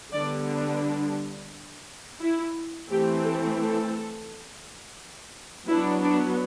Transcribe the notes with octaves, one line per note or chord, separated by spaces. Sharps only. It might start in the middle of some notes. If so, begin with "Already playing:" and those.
D3 G3 B3 D4 D5
E4
E3 A3 C4 G4
A4
A4
F#3 B3 D4 E4
D4